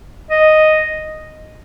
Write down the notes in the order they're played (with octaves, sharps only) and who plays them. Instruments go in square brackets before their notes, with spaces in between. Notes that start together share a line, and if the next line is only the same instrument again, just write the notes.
[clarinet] D#5